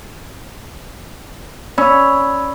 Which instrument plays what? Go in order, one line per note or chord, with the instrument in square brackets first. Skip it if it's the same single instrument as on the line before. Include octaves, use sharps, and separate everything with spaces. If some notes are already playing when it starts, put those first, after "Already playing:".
[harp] C#4 [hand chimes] D5 B5 E6